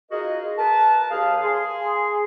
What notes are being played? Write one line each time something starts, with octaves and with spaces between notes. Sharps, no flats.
D#4 F4 F#4 G#4 A#4 D#5
A#4 B4 A5
D#2 G#4 F5
G#4 C6